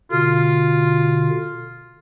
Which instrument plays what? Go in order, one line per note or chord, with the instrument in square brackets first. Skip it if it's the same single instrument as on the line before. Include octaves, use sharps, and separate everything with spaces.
[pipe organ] B2 D3 [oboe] F4